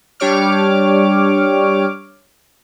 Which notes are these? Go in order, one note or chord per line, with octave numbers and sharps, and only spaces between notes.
G3 D4 G4 C#5 D6 F6